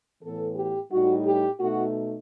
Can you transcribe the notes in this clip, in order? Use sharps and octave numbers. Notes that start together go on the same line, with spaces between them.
A2 E3 B3 A4
G4
A2 G3 D#4 F#4
G4
B2 A3 D#4 F#4